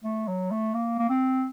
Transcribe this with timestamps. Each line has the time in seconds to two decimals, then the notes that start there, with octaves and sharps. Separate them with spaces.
0.04 A3
0.28 F#3
0.51 A3
0.74 A#3
0.99 A#3
1.09 C4